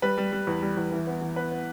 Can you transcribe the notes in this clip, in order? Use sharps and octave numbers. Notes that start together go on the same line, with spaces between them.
G3 B4
G3
G3
E2
G3
E2
E3
B3
E3
B3 B4
B3